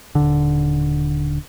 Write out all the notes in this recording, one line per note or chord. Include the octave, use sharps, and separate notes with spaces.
D#1 D3